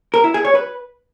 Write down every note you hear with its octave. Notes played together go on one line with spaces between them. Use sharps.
A#4
E4
G#4
C#5
B4